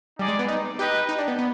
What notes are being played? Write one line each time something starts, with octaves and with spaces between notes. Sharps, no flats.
G3 D#4 G#4 D5
G#3
B3
D#4
D#4 G4 B4 D#5 G5
D#4
D4
B3
B3